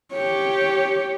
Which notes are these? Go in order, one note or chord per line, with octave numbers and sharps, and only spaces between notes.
G4 C#5